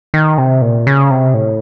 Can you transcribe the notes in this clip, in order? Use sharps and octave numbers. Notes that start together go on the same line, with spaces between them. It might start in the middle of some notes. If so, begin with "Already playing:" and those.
D#3
C3
A#2
C#3
C3
A2